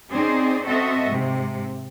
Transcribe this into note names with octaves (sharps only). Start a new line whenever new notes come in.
C4 C#4 D#4 G#4 C5 D5
C4 F#4 A4 D#5 E5
G#2 C3